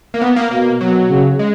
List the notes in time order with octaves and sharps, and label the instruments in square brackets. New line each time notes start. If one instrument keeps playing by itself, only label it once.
[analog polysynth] A#3
B3
A#3
[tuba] B2 [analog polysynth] A#3
[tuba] B2 [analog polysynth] F#3
[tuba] C#3
[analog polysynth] G#3